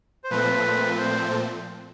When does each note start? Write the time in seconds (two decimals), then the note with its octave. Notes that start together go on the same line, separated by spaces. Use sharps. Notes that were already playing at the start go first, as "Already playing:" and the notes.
0.24 C5
0.31 A#2 F3 A3 C4 B4
0.98 C5